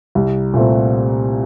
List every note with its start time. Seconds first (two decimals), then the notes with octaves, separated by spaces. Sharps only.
0.15 C2
0.54 A#2 A3 C4